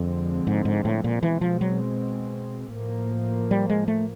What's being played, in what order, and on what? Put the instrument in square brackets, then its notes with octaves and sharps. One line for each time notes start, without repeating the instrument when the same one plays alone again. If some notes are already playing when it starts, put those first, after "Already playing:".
Already playing: [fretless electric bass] F2 [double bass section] D3 F3 G#3 C4
[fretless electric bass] G#2
G#2
A2
A#2
[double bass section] B2 G#3 C4 [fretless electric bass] E3
[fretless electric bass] F3
F#3
[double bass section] A2 F3 A#3
[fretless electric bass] G3
G#3
A3